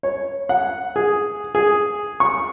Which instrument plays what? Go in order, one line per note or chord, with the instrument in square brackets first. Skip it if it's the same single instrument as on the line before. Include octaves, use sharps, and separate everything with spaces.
[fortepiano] C#5
F#5
G#4
G#4
C#6